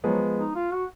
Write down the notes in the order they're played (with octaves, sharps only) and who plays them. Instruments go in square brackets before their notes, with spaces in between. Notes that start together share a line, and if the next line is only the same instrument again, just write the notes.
[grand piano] F3 G#3 B3 [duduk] F#3
[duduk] D#4
F4
F#4